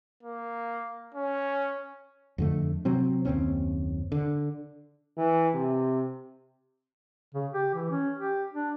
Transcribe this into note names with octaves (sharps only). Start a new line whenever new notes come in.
A#3
C#4
F2 D3 A3
C3 F#3 C4
F#1 D#2 C4 C#4
D3
E3
C3
C#3
G4
E3
C#4
G4
D4